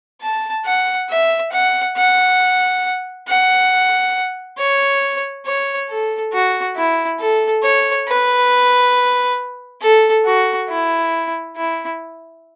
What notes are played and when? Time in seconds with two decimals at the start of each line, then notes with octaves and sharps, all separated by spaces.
0.21 A5
0.65 F#5
1.09 E5
1.52 F#5
1.96 F#5
3.28 F#5
4.58 C#5
5.46 C#5
5.89 A4
6.32 F#4
6.76 E4
7.19 A4
7.63 C#5
8.08 B4
9.81 A4
10.25 F#4
10.69 E4
11.56 E4